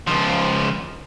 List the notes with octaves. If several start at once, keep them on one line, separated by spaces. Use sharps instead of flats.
C#2 F3